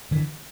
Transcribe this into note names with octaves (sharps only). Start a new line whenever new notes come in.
D3 E3